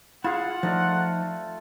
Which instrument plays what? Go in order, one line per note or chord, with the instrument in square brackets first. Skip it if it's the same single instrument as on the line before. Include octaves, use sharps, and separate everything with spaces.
[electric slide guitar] E4 G#4 F5 [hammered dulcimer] F4 [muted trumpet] F#5
[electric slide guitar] F3 D#4 D5 [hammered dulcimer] A3